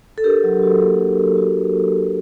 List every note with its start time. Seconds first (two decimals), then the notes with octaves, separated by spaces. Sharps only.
0.18 A4
0.24 D4 G4 A#4
0.44 F#3
0.63 F#4
0.81 A#3
0.99 D4
1.18 F#3
1.37 F#4